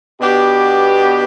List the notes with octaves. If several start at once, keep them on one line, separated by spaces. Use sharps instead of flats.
B2 B3 D4 G4